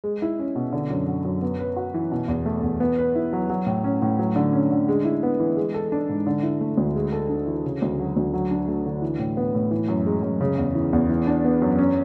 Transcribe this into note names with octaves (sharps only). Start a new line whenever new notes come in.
G#3
E4
C#4
B2
D3
F#2
F#3
F#2
B3
B4
F#4
E3
B2
E2
A3
E2
B3
B4
E4
F#3
F#3
A2
C#4
A2
F#3
D3
C#4
D3
G#3
E4
B3
E3
G#3
A4
D4
G#2
D3
E4
A3
D2
G#3
A4
D4
E3
C#3
D2
F#3
D2
F#3
D4
A3
D3
E3
A2
B3
A2
E3
F#2
G#3
F#2
C#3
E2
E3
E2
E3
D4
B3
F#2
C#4